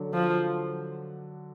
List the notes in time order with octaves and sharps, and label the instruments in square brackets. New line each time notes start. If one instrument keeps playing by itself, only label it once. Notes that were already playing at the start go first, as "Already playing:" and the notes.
Already playing: [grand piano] D3 F#3 D4
[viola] F3